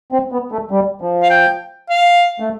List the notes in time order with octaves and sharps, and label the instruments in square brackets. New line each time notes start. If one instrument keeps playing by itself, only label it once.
[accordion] C4
B3
A3
G3
F3
[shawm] F5
G5
F5
[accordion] A3